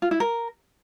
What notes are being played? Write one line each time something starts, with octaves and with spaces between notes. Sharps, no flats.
F4
E4
A#4